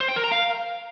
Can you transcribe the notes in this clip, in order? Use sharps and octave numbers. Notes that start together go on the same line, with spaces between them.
C5
G5
A#4
A#5
F5